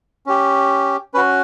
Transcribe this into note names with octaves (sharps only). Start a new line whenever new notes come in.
C#4 G4
C#4 F#4 B4